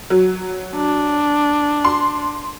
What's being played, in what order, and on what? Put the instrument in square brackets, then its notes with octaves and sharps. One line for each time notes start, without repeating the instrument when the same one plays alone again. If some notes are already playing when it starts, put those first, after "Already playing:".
[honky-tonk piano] F#3
[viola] D4
[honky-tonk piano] C6